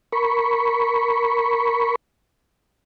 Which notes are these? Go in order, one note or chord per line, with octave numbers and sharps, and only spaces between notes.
A#4 B5 C#6